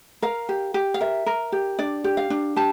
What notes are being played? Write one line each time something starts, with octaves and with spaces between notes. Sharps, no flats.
A#4 F5
G4
G4
F5
A#4 E5
A#4
G4
D4 D5
G4
F5
D4
G4 A5